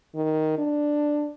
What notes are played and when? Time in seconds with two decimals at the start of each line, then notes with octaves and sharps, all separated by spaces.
0.15 D#3
0.58 D4